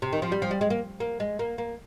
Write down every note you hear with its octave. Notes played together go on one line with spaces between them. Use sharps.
C3
D#3
F3
G3
F3
G3
G#3
A#3
A#3
G#3
A#3
A#3